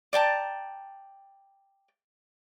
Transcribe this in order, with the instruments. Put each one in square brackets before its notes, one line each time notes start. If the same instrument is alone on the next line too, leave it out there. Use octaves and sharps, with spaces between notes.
[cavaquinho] D5 G5 A5 A#5